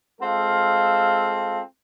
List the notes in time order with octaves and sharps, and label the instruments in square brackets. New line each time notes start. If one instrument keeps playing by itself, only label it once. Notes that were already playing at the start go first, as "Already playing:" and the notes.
[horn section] G#3 C4 F4 A4 F5